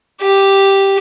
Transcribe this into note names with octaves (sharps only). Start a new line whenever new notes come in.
G4